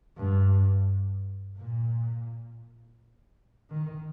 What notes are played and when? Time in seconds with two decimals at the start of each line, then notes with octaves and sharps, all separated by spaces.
0.17 G2
1.57 A#2
3.70 D#3